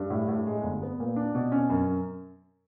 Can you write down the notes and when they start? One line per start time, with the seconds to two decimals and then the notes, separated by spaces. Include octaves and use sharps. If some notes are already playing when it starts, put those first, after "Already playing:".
Already playing: G2
0.10 A2
0.28 A2
0.47 G#3
0.63 G1
0.82 B3
1.00 A#2
1.16 D4
1.35 B2
1.52 C#4
1.70 F#2